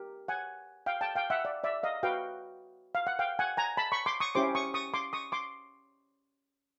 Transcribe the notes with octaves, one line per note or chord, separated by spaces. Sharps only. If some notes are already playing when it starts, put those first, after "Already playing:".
Already playing: G4 A#4
F#5 G#5
F5 G5
G5 A5
F5 G5
E5 F#5
D5
D5 E5
D#5 F5
F#4 B4 F5 G5
F5
F#5
F5 G5
F#5 G#5
G#5 A#5
A5 B5
B5 C#6
C6 D6
C#6 D#6
C#4 E4 G4 C5 C6 D6
C#6 D#6
C#6 D#6
C6 D6
C#6 D#6
C6 D6